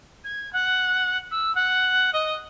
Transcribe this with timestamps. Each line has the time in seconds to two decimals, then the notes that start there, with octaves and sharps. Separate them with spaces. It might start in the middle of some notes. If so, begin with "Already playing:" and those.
0.24 G#6
0.53 F#5
1.31 E6
1.55 F#5
2.13 D#5